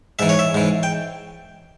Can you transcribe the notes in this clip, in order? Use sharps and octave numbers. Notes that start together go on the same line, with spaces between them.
G#2 E3 E5
C#5
E5
G#2 E3
G5